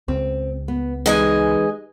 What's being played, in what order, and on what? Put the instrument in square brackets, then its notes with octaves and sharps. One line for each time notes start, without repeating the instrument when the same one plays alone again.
[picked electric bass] C#2 [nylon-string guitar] C4
[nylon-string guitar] B3
[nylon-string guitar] E3 D#4 [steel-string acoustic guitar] G#3 D#5 G#5